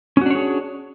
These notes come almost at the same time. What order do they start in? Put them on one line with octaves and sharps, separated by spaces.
C#4 F#4 D4 C#5 G#4